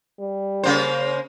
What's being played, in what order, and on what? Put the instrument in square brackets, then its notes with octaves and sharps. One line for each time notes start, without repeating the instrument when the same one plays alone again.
[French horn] G3
[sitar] C#3 A#3 C5